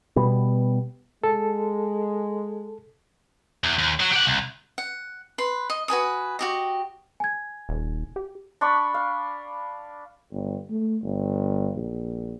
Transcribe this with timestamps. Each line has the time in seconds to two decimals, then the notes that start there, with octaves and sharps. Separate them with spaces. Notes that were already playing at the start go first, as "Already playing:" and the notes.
0.16 B2 G3 B3
1.24 G#3 A4
3.64 E2
3.79 D#2
4.00 F#3 F#4
4.12 G4 F#5
4.27 C2
4.78 F#5
5.38 B4 C6
5.70 D#5
5.88 F#4 B4 G#5 D#6
6.39 F#4 G4 D#5
7.20 G#5 G#6
7.69 D#1
8.16 G4
8.61 D4 D5 B5 C#6
8.94 F5
10.32 G1
10.71 A3
11.03 G1
11.76 A#1